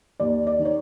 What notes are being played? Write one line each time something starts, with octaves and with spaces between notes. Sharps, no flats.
D#2 D5
D5
D#3
C#5